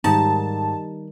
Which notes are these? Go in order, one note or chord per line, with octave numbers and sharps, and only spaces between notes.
G#2 D#3 G3 D#4 A5